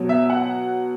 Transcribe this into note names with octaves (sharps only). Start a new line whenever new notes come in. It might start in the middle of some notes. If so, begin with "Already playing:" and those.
Already playing: B2 F#3
E5
F#5